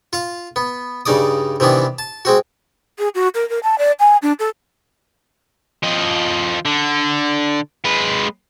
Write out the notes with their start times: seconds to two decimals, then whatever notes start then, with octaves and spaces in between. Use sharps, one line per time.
0.13 F4 F5
0.56 B3
1.06 G2 C#3 D#4 D5 D#6
1.60 C3 D#3 E3 B3 D4
1.99 A5
2.25 G#3 C4 F#4
2.99 G#4
3.15 F#4
3.35 A#4
3.50 A#4
3.63 A5
3.78 D5
4.00 G#5
4.22 D4
4.39 A4
5.83 F3 D#5
6.66 D3
7.85 G#3 B4